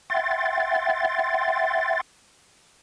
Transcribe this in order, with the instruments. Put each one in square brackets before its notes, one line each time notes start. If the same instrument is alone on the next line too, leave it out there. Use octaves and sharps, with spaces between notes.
[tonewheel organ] E5 F#5 G5 C6 A6